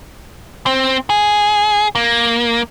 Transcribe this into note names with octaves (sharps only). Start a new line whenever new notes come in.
C4
G#4
A#3